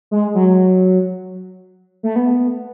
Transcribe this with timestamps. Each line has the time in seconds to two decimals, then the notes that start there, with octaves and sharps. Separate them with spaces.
0.11 G#3
0.35 F#3
2.03 A3
2.16 B3